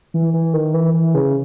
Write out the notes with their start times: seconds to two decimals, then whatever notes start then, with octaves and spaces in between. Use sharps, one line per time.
0.14 E3
0.34 E3
0.54 D#3
0.74 E3
0.94 E3
1.14 C#3